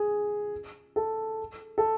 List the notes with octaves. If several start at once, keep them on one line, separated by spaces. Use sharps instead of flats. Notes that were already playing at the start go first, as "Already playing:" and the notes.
Already playing: G#4
A4
A4